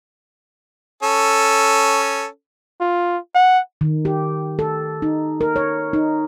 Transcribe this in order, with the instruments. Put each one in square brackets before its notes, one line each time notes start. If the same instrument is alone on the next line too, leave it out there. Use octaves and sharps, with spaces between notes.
[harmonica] C#4 A4
[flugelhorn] F4
F#5
[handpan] D#3
G4
A4
D#4
A#4
C#5
D#4